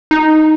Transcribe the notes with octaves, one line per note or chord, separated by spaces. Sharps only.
D#4